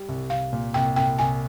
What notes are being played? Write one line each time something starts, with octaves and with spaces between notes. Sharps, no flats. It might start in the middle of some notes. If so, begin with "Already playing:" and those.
Already playing: G3
C2
C2 F5
A#2
C2 G5
C2 G5
C2 G#5